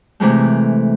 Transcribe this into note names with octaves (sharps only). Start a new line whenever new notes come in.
C3 E3 G#3 A3